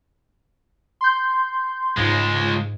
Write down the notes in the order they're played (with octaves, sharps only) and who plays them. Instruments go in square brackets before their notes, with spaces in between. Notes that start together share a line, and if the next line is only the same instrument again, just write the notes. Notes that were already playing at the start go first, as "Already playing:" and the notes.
[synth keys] C6 G6
[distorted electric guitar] C#2 G#3 [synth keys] G#2